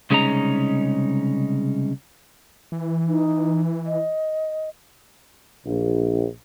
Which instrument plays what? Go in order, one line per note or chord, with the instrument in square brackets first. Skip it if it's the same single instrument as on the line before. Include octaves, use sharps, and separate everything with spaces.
[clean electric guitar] C2 C#3 G#3 C#4 D#4 A#5
[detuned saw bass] E3
[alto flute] D#4
D#5
[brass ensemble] A#1